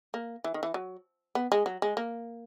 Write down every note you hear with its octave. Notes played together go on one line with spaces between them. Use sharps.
A#3
E3
D#3
E3
F#3
B3
G#3
F#3
G#3
A#3